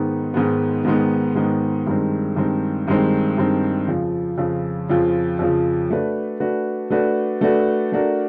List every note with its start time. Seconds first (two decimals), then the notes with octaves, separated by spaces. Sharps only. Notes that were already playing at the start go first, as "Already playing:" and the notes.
Already playing: G#2 D#3 G#3 B3
0.34 G#2 D#3 G#3 B3
0.85 G#2 D#3 G#3 B3
1.35 G#2 D#3 G#3 B3
1.86 G2 D#3 G#3 C4
2.36 G2 D#3 G#3 C4
2.87 G2 D#3 G#3 C4
3.37 G2 D#3 G#3 C4
3.88 F2 C#3 F3
4.38 F2 C#3 F3
4.89 F2 C#3 F3
5.39 F2 C#3 F3
5.90 A3 D4 F#4 B4
6.40 A3 D4 F#4 B4
6.90 A3 D4 F#4 B4
7.41 A3 D4 F#4 B4
7.92 A3 D4 F#4 A#4